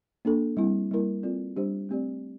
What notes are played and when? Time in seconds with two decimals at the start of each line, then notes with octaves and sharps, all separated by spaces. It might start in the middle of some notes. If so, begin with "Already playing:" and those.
0.25 A#3 D4 A4
0.57 G3 C4 E4
0.91 G3 A#3 E4 A#4
1.23 C4 F4 A4 D5
1.56 G3 D4 G4 C5
1.89 A3 C4 G4 D5